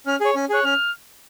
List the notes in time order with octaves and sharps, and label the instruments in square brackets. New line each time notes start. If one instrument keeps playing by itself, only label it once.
[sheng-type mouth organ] C#4 [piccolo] F6
[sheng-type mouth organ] G#4 C#5
C#4
[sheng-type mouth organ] G#4 C#5 [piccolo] F#6
[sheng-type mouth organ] C#4 [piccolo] F6